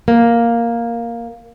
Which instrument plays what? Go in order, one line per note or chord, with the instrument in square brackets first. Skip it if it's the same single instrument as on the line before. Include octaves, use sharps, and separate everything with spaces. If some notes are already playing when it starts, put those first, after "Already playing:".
[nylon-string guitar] A#3